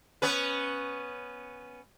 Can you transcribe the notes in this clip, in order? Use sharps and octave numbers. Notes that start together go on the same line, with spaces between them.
B3 C#4 B4